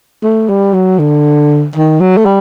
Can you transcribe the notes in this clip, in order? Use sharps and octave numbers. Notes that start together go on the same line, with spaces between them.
A3
G3
F#3
D3
D#3
F#3
A3
G3